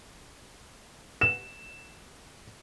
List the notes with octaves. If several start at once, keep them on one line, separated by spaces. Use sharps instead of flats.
E7